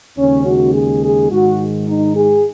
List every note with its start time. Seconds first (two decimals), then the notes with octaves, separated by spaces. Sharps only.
0.18 D#2 C#3 G#3 C#4
0.46 F#4
0.74 G#4
1.04 G#4
1.31 G#2 D#3 G#3 F#4
1.88 D#4
2.16 G#4